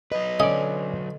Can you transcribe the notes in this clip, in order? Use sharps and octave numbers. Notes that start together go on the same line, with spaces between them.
F#3 B4 D#5
D3 C#4 A4 D5 D#5